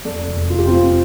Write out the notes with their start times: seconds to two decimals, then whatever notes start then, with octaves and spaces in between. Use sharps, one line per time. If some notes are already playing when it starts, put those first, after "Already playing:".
0.05 F2 A4 D5
0.27 F1
0.50 F1 F4
0.58 G4
0.67 C4 F4
0.73 C3